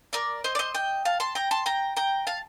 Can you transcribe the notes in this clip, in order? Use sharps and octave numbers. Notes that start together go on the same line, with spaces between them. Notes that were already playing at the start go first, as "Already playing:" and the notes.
A#4 D5
C5 D#5
D5
C5 D#5
D#5 G5
F5 A5
A5 C6
G5 A#5
A5 C6
G5 A#5
G5 A#5
F5 A5